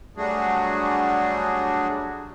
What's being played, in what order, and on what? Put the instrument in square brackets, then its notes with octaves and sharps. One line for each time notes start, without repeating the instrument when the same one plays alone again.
[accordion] F#3 G3 A3 D4 F#4 G#4